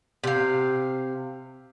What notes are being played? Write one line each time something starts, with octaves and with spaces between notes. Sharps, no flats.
C3 F5